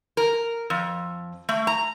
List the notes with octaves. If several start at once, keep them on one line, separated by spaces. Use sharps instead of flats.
A#4
F2
A3
A#5